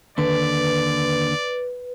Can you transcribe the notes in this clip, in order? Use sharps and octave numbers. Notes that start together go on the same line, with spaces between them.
D#2 D3 B4 D5